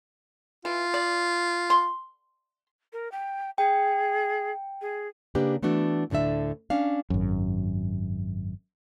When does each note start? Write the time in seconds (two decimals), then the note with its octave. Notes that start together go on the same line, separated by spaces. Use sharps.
0.65 E3 F4
0.94 D5
1.70 C6
2.93 A#4
3.12 G5
3.58 G#4 G5
4.81 G#4
5.35 C#3 A#3 D4 G4 B4
5.62 E3 A3 B3 D4 F#4
6.10 D2 A2 D3 D4 E5
6.70 C#4 D4 F5
7.10 G#1 F#2